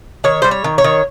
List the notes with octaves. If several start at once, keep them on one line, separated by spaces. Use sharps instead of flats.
D#3 C#5
G3 C5
C#5
D#3
C#5
D#3